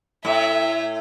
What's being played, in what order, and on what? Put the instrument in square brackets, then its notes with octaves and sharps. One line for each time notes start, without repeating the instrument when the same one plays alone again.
[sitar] A2 [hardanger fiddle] E5